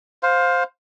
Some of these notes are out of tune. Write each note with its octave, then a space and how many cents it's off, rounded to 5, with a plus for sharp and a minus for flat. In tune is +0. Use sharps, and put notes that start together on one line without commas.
C5 +0 F5 +20